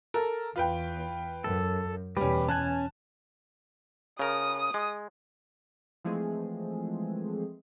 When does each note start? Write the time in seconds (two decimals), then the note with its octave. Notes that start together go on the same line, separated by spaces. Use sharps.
0.14 A4 A#4
0.56 E2 F4 B4 G5
1.44 F#2 A4
2.17 E2 B2 G3 C#4 G4 B4
2.48 C#4 G#5 A5 F#6
4.19 C#3 A#4 D#6
4.74 G#3
6.04 E3 F3 G#3 A3 C4 G#4